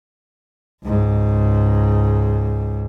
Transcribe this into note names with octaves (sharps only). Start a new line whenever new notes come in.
C#2 G#2